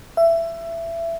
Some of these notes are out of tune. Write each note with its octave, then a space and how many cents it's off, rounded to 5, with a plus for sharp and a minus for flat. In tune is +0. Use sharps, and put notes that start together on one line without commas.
E5 +20